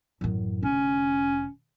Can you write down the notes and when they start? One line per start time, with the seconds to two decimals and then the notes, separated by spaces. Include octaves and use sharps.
0.21 A1 F#2
0.63 F1 D3 C#4